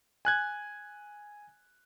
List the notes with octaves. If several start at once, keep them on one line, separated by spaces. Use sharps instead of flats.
G#5 F#6 G#6